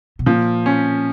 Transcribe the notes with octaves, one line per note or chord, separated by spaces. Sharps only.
B2
A#2 F3
C#4